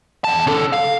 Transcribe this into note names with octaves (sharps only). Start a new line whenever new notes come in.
E2 A5
C#3 A4
F5